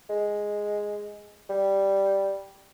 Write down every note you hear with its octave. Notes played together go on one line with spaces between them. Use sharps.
G#3
G3